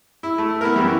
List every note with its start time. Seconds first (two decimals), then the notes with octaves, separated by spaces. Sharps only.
0.23 E4
0.38 A3
0.61 B3 E4 A#4
0.76 F#2 E3 G3